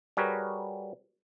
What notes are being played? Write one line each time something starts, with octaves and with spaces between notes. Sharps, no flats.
G3 F#4 G#4 A#4 B4 C#5